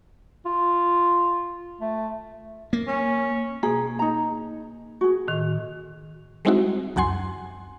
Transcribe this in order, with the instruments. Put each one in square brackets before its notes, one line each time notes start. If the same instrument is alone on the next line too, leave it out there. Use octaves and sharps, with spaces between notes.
[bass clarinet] F4
A3
[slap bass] A#3
[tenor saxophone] C#4
[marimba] B2 A#3 [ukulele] G#4
[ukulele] D#4 A#5
F#4 G#4
[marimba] A2 D#3
[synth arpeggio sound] G3 G#3 C4 D#4 E4 F#4
C#2 F#2 F#5 G#5 C6